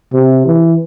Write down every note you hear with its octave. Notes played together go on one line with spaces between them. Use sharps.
C3
E3